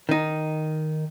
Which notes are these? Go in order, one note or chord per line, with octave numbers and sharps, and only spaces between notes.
D#3 D#4